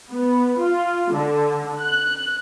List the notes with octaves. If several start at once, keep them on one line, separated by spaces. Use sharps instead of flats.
B3
F4
D3
F#6